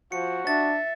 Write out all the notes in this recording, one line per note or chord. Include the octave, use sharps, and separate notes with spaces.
F3 F#4 C#7
D4 E5 A6